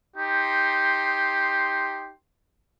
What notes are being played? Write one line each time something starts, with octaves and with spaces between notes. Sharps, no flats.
D#4 G4 C6